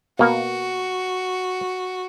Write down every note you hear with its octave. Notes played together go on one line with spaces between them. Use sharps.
B2 A#3 F#4